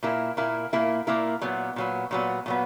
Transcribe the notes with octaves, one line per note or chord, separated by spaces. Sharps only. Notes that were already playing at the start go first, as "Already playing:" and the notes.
A#2 A#3 E4 A#4
A#2 A#3 E4 A#4
A#2 A#3 E4 A#4
A#2 A#3 E4 A#4
A#2 F#3 B3
A#2 F#3 B3
A#2 F#3 B3
A#2 F#3 B3